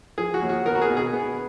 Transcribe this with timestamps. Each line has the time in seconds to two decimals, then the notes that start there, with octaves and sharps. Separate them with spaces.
0.18 F3 G#4
0.34 F#4
0.42 D#2
0.49 F#4
0.66 B3 A#4
0.75 F#4
0.82 G#4
0.90 B2
0.97 G#4
1.13 B3